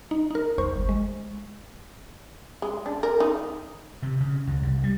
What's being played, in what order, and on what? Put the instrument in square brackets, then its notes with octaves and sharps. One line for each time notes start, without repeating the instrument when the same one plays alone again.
[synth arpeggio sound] D#4
D#4 A#4
B1 E2 C5 C#6
G1
G#3
[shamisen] G#3
D4
A#4
D#4
[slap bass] C3
C#3
C#2
C2
G3